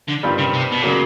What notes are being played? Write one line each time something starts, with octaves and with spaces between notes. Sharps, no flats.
D3
G2 D#3 G3 C4 F4
C#3
C3
B2
A#2 C#3 F#3 A#3